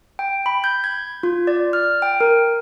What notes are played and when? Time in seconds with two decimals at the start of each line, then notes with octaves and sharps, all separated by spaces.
0.19 G5
0.46 B5
0.64 G6
0.84 G#6
1.23 F4
1.47 D5
1.73 F6
2.02 G5
2.20 A#4